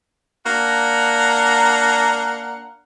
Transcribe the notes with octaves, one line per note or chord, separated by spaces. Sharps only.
A#3 D4 F#5 A#5